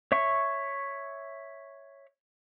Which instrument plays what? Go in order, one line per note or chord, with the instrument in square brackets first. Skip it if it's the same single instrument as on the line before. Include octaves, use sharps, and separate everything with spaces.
[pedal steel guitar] C#5 E5 C#6